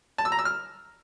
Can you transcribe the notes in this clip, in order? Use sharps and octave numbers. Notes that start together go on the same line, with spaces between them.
A5
E6
A#5
E6
F6